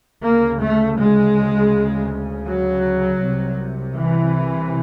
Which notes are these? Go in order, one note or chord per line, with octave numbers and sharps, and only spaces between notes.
D2 C#3 A#3
A3
G#3
F#3
C2 C3
E3